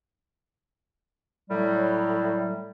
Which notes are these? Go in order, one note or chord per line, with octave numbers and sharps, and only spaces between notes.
A2 F#3 G3